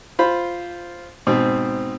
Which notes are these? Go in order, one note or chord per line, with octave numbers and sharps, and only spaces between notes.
F4 C5 B5
G#2 B2 C4